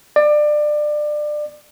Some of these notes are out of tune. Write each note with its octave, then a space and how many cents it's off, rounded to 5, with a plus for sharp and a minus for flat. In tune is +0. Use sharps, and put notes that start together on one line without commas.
D5 +25